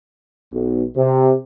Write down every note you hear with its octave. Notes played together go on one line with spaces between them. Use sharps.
B1
C3